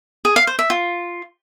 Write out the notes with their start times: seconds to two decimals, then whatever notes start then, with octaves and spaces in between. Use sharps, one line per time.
0.25 G#4
0.36 F5
0.47 C5
0.59 E5
0.70 F4